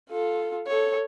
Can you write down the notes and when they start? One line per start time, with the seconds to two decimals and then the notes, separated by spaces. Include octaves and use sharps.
0.10 F4 A4
0.67 A4 C#5